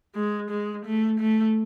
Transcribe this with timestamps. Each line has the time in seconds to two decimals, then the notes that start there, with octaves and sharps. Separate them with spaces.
0.15 G#3
0.50 G#3
0.85 A3
1.19 A3